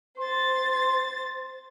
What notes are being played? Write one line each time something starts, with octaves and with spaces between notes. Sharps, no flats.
C5 C6 A6